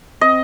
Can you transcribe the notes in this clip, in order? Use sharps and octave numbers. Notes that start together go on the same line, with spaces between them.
C4 D#5